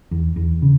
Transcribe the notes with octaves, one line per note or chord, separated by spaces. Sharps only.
E2
E2
C#3